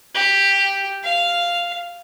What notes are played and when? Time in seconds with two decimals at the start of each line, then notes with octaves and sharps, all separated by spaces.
0.15 G4
1.03 F5